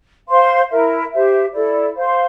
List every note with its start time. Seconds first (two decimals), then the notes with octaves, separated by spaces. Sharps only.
0.28 C5 F5 C6
0.70 E4 A#4 E5
1.11 G4 C5 E5
1.53 E4 A4 D5
1.94 C5 F5 C6